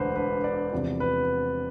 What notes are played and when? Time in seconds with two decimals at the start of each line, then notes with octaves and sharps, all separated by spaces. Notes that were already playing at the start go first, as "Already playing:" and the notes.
Already playing: E1 D2 D3 B4 C5
0.16 B4
0.44 D5
0.72 E2 C3 F3 D5
1.00 B4